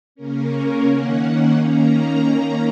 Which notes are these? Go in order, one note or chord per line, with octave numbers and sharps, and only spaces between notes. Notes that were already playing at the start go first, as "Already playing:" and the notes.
C#3 A#3 C#4 A#4
C#5
D#3 A#3 C#4 F#5
F#5
D#3 A#3 C#4 A#5